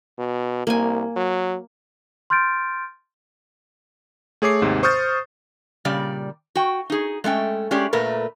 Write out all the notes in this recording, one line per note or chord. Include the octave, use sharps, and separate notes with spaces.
B2
C2 A#3 G#5
F#3
C6 F6 G6 A6 D7
A3 G#4 C#5 D6 C7
D#2 G#2 C3
C5 C#6 D#6 F6 G6 A6
A#2 C#3 G3 D5
F#4 G5
D#4 G#4
G#3 A3 C#4 G5
G#3 C#4 G4 D5
A#2 A3 A#4 B4